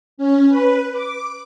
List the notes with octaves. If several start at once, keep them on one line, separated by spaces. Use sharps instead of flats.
C#4
B4
D6